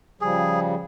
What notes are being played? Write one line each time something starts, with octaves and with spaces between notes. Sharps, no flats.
C#3 F3 G3 G#4